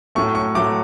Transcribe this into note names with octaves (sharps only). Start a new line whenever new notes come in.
A2 F#3 A3 C#6
C#6
A2 F#3 A3 D6